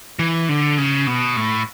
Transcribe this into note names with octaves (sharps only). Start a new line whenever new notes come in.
E3
D3
C#3
B2
A2